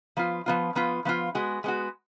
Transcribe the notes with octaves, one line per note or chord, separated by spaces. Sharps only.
F3 B3 F4
F3 B3 F4
F3 B3 F4
F3 B3 F4
G#3 B3 F#4
G#3 B3 F#4